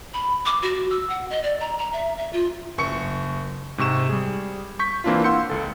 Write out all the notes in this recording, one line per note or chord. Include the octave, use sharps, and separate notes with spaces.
B5
D6
F#4
E6
F#5
D#5
D5
A#5
A#5
E5
E5
F4
F#1 C#6 C#7
G#2 C3 C#6 E7
G3 G#4
C#6 G6 B6
E3 A#3 C4 D4 E4 F4
F5 F#5 C6 E6 G6 C#7
C#2 A4